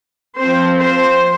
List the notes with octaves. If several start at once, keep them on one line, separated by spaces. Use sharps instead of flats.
F3 C4 C5
C5